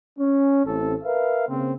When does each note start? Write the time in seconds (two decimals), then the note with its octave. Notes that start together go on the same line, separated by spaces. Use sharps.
0.18 C#4
0.65 A1 A2 C4 A4
1.03 A#4 B4 E5 F5
1.47 C#3 A#3 C4